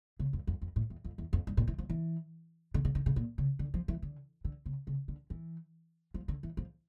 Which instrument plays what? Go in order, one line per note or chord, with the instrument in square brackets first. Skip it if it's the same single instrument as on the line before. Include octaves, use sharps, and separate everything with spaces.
[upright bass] C#3
F2
F2
F2
A2
E2
F2
E2
F2
G2
A#2
E3
F3
E3
D3
C#3
D3
C#3
A#2
C#3
D3
F3
E3
D3
D3
C#3
C#3
D3
E3
F3
D3
E3
F3